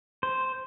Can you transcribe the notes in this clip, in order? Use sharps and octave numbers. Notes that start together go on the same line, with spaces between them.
C5